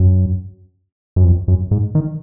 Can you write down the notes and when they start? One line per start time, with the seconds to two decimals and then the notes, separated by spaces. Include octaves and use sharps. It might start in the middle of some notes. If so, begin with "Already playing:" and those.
Already playing: F#2
1.16 F#2
1.24 F2
1.48 F#2
1.71 G#2
1.95 D#3